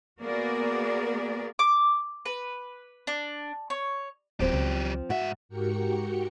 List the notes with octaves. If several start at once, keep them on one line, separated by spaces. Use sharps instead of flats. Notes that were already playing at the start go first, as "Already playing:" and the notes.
A#3 B3 F#4 G#4 A#4 D5
D6
B4
D4
C#5
D1 F3 F#3 C4 G4
C#2
G#2 F#4 E5
G#2 F#4 G4 A#4 G5 C#7